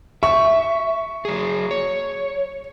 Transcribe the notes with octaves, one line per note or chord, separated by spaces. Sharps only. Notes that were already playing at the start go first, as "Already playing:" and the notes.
E5 C#6
F#3 G#4
C#5